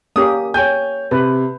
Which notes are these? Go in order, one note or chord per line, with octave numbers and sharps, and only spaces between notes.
A#3 C#4 G4 D#6
C#5 G5 G#5 G6
C3 B4